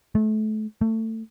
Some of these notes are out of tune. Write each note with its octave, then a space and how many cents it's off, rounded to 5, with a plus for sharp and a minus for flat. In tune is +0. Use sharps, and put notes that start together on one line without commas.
A3 -30
A3 +20